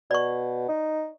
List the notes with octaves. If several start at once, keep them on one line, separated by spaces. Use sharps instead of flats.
B2 D5 C#6
D#4